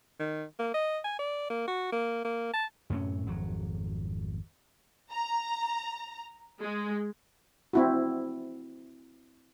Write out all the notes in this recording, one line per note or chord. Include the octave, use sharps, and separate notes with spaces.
D#3
A#3
D#5
G#5
D5
A#3
F#4
A#3
A#3
A5
F#2 A2 C3 C#4
G#1 F2 F#3
A#5
G#3
C4 E4 F#4